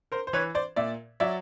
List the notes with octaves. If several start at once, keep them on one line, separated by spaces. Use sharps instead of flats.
A#4 C5
C5
E3 B4 C#5
C5 D5
A#2 D5 E5
F#3 D5 E5